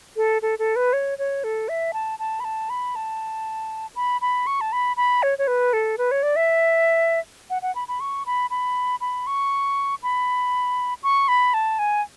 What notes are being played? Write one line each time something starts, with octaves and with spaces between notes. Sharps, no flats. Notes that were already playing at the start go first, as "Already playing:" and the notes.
A4
A4
A4
B4
C#5
C#5
A4
E5
A5
A5
B5
A5
B5
A5
B5
B5
C#6
A5
B5
B5
C#5
C#5
B4
A4
B4
C#5
D5
E5
F#5
F#5
B5
B5
C#6
B5
B5
B5
C#6
B5
C#6
B5
A5
G#5